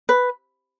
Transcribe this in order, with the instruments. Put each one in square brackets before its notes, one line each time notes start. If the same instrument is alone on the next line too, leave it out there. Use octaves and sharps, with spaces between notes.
[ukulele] B4